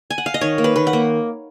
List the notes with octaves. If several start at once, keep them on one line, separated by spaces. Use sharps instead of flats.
G#5
F#5
F5
D#5
D#3 C#5
A#3
B4
D#3 B4
F#5
A#3